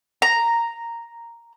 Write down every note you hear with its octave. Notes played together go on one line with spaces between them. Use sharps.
A#5